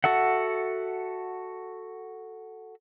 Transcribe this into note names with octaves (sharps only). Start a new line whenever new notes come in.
F#4 A4 E5 F#5